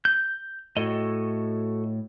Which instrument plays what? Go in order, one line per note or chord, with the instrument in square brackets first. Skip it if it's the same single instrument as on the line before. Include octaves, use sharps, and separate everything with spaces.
[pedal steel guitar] G6
[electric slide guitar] A2 [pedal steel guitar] F#4 A4 D#5